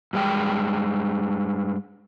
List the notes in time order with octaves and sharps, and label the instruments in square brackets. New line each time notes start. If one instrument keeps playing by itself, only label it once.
[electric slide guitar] G2 G#3 G5